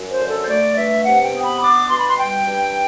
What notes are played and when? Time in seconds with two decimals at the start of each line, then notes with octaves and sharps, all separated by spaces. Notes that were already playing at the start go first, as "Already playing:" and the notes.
Already playing: F#2
0.11 C5
0.20 D3
0.29 A4
0.43 C5
0.48 A3 D5
0.76 G2 E5
1.04 C3 F#5
1.24 G5
1.33 B3
1.43 B5
1.62 D4 D6
1.89 B2 C6
1.99 B5
2.09 C6
2.18 G3 G5
2.47 G2